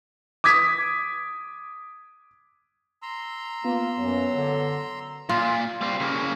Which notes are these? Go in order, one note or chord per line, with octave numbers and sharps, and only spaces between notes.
D6 D#6 G#6 B6
A#5 C6 E6
A#3 B3 F4
F#2 F#3
D3
A#2 F4
G3 C4
C#3 A#3